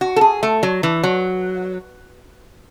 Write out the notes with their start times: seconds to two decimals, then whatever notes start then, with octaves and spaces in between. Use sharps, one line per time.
0.01 F#4
0.16 A4
0.21 G#4
0.43 A3
0.63 F#3
0.83 E3
1.03 F#3